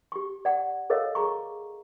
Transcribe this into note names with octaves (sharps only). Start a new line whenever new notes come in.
G4 C#6
D5 F#5
A4 A#4 C#5 D#5 F5
G#4 A#5 C#6